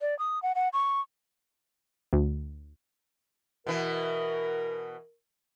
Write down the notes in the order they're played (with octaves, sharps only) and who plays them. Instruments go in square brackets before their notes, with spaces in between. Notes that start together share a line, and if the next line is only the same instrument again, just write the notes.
[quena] D5
D#6
F#5
F#5
C#6
[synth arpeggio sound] D2
[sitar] B2 E3 [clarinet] A#4